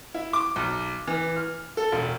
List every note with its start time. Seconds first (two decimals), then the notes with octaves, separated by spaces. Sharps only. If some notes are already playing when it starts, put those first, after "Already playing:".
0.14 E4
0.33 D6
0.56 B1
1.07 E3
1.36 F6
1.77 A4
1.92 E1